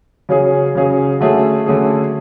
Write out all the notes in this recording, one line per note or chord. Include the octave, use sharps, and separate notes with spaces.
C#3 F#3 C#4 G#4
C#3 F#3 C#4 G#4
D3 F#3 A3 C#4 G#4
D3 F#3 A3 C#4 G#4